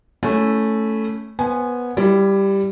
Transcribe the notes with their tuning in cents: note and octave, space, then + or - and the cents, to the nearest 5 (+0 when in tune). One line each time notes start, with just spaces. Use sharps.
A3 +0 C#4 +10 E4 +0
B3 -10 C5 +0 G#5 +0
G3 +0 E4 +20